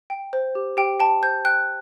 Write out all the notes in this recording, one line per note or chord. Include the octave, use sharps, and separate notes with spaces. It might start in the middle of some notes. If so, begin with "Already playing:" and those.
G5
C5
G4
G4 G5
G5 A5
C5 G6
G5 F#6